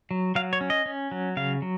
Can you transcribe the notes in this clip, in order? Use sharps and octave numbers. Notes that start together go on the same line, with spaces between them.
F#3
F#3 F5
C#5
C#4
D#5
C#4
F#3
C#3 F5
F#3